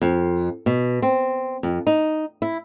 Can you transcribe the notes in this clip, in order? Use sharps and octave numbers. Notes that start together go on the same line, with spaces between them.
F2
B2
C4
F2
D#4
E4